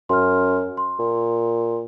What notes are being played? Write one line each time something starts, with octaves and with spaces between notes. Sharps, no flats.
F#2 C6 F6
C6
A#2